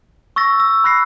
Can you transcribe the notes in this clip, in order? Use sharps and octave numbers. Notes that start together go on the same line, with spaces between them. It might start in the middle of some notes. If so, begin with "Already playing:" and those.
C#6 E6 A6 A#6
E6
B5 F#6 A#6 C7